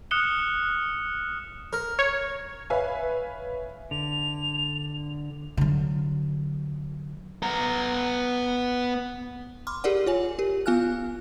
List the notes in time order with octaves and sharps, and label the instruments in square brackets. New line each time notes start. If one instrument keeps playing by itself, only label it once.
[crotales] D#6 F6 F#6 C#7 E7 G7
[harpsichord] A#4
[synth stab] C#5
[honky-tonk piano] B4 C#5 E5 F5 G#5
[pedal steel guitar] D3 [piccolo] F7
[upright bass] D3 F#3
[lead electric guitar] B3 A#5
[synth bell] B5 C6 D6 F6
G4 G#4 A#4 D5 F#5
F4 C#5 G#5
G4 A#4
B3 F4 F5 G#5 F6 F#6